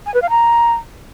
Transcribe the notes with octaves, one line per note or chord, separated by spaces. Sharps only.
G#5
B4
F5
A#5